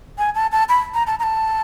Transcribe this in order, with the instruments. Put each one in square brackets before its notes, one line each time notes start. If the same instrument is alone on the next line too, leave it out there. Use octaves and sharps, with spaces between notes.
[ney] G#5
A5
A5
B5
A#5
A5
A#5
A5